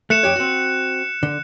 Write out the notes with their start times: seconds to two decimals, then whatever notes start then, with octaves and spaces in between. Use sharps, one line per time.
0.10 A3 F#6 C#7 E7
0.23 F2 G4 C#5
0.36 C4 F#4
1.23 D3